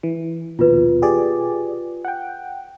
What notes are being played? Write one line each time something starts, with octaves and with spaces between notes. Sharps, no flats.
E3
A#1 D#2 B2 F4 B4
G4 G#4 D5
F#5 G5